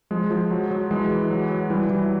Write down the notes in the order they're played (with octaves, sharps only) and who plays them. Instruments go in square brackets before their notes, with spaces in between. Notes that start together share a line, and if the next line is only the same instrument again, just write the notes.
[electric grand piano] F3 G#3
F3
F#3
F#3
E3 G#3
E3
F#3
F#3
E3 G3
E3